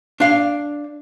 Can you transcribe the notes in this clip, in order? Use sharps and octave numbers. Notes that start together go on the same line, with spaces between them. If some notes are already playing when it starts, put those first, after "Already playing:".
D4 F5